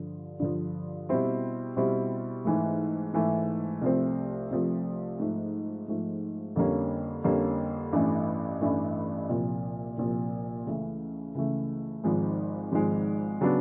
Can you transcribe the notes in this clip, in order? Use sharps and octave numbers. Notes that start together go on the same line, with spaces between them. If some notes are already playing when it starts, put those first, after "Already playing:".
Already playing: G2 D3 F3
G2 D3 F3
B2 G3 C4 E4
B2 G3 C4 E4
G#2 E3 A3
G#2 E3 A3
C2 C3 F3 A3 C4
C2 C3 F3 A3 C4
G#2 F3 A3
G#2 F3 A3
F2 D3 G3 A#3 C#4
F2 D3 G3 A#3 C#4
A1 G2 E3 A3
A1 G2 E3 A3
C2 A#2 F3
C2 A#2 F3
C#2 C#3 E3 A3
C#2 C#3 E3 A3
G#1 G#2 F3 G#3
G#1 G#2 F3 G#3
C#3 F#3 B3 D4